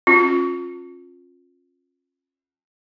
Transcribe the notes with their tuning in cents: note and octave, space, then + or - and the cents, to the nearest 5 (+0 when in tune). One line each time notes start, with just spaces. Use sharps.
C#4 -35 F4 +20